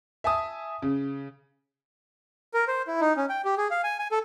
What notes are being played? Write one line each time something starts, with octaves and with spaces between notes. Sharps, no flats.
E5 G#5 A5 D#6
C#3
A#4
C5
E4
D#4
C#4
G5
G4
G#4
F5
G#5
G#5
A4